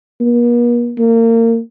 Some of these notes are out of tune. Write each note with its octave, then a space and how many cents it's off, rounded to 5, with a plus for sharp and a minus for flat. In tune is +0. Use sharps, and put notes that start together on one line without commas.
A#3 +45
A#3 -30